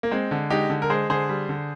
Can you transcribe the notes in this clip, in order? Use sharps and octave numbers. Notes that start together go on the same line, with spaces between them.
A#3
G#3 C4
D3
G#3 D#4 G4
D3
A#4
G#3 G#4 C5
D3 G#4 C5
G3
D3